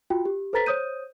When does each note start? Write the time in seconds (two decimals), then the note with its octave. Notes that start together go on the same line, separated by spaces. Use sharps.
0.10 F4 F#4 G5
0.25 G4
0.53 A4 B4 C5 A#5 A6 B6
0.66 C5 C#5 D#6 G6 D#7